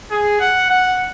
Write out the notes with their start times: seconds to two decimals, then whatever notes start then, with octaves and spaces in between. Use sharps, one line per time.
0.11 G#4
0.40 F#5
0.70 F#5